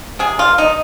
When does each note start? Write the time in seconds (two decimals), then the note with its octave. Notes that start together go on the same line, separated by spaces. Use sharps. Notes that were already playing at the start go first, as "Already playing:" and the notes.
0.19 C3 G#4
0.39 F4
0.45 A#3
0.58 D#4